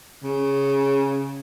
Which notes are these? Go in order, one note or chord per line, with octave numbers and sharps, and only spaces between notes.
C#3